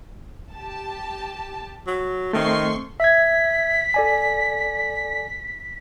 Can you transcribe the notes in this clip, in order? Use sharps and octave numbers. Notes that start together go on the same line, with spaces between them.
G4 A5
F#3
D#3 A3 C4 C6 C#6 C7
E5 G#6 B6
A4 D5 G#5